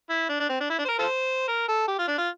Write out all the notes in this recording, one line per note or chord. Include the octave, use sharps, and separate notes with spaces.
E4
D4
D4
C4
D4
E4
D4
C5
A#4
F4 A4 C5
A#4
A4
G4
F4
D4
F4